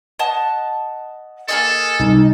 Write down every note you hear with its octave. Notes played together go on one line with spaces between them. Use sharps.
D#5 F#5 A5
A#3 G#4 A4 D#5
C2 D#4